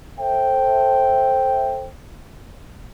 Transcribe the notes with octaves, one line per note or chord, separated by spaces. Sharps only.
A4 C5 E5 G5